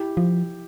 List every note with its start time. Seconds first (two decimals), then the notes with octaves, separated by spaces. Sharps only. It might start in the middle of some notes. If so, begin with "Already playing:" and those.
Already playing: E4 G4
0.17 F3